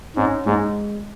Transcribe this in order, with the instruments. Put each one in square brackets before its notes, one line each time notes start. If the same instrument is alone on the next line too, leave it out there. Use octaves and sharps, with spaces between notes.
[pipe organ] G#2 [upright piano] C#4
[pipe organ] G#2 [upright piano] G#3